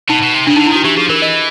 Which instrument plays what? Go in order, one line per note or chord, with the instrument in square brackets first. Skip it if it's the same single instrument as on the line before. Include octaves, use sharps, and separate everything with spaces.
[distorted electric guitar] B2 [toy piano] D#4
[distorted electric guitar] B2
C3
[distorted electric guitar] C#3 [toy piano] D4
[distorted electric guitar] D3 [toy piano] D#4
[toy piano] E4
[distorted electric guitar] D#3 [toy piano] F#4
[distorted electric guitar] E3 [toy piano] G4
[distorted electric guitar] F3 [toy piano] G#4
[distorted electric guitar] E3 [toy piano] A#4
[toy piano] D#5